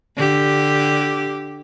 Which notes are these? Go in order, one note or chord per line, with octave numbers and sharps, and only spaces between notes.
D3 G4